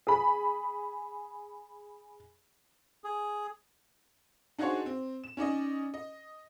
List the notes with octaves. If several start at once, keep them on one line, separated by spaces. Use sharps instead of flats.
G#4 B5
G#4
D4 D#4 F#4 G#4 C5 C#5
C4
E7
C#4 D#4 D5 D#5
D#5